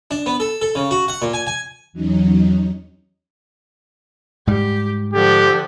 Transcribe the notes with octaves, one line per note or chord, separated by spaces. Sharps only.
D4
B3
A4
A4
C#3
F#4
F#5
A#2
G#5
G#5
E2 F#3 C#4 D#4
G#2 G3 G4
D3 F3 G4